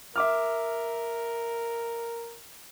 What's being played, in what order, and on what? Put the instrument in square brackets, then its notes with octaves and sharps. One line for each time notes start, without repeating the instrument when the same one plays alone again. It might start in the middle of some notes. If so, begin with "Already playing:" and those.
[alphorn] A#4 [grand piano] E5 D6 F6